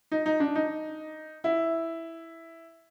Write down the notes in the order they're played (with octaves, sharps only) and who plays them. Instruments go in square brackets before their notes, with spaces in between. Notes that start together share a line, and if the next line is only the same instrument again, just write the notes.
[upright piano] D#4
D#4
D4
D#4
E4